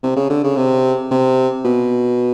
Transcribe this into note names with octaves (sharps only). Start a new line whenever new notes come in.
C3
C#3
D3
C#3
C3
C3
B2